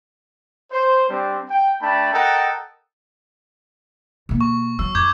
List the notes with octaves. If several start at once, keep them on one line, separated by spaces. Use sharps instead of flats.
C5
G3 C4 D4
G5
A3 D4 G5 A5 B5
A4 A#4 D#5 F#5 G5 A#5
B2 A#3
C#6
F#3 E6
F2 D6 G6 G#6